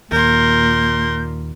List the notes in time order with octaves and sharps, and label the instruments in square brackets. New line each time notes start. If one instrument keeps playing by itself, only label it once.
[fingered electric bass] D#2 [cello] A#2 [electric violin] A#4 C6 [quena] G6